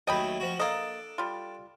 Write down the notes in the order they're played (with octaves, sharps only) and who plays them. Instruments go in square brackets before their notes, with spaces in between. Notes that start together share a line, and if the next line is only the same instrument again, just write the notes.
[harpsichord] D#2 F#3 A3 [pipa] D#5 G5 B5
[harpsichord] F3 F#4
[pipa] A#3 D#5 [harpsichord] D4 A4
[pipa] G3 F4